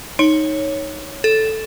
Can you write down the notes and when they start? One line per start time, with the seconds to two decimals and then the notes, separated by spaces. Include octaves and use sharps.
0.19 D#4 C#5
1.24 A4